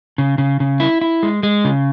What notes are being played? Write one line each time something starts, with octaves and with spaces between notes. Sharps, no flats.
C#3
C#3
C#3
E4
E4
G#3
G#3
C#3